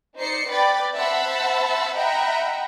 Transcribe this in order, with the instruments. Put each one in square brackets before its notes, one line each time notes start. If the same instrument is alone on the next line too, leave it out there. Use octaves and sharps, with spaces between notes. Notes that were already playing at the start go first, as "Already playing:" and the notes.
[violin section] D#4 C5 D5 C7 C#7
B4 D5 G5 B5 A6
C5 E5 F#5 A5 B5 E6
D#5 E5 F#5 G5 A#5 B5